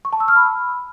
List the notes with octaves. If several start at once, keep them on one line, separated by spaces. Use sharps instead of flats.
C#6
A5
E6
F6
B5